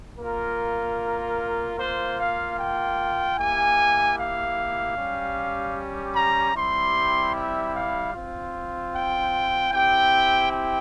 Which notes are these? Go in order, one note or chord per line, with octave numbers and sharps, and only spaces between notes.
A#3 F4 A#4
A#3 F4 C5
F5
G5
A#3 E4 G4 G#5
F5
G3 C#4 G4
A#5
G3 C4 E4 G4 C6
E5
F5
C4 F4
G5
C4 E4 G4 G5
G5